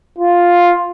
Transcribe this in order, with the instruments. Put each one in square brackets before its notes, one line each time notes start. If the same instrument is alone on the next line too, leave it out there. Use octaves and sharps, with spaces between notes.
[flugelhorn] F4